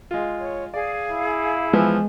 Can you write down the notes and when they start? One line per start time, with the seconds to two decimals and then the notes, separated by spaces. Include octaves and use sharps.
0.11 G#3 F4
0.40 C#5
0.74 G#4 D5 F5
1.11 E4
1.73 E3 F3 G#3 B3